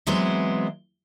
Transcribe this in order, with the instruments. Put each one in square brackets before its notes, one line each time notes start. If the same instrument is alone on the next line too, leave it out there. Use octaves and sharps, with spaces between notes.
[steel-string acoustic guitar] E3 F#3 G#3 B3 C4 C5